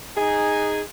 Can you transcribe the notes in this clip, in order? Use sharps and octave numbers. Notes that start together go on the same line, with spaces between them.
D#4 G#4 G#5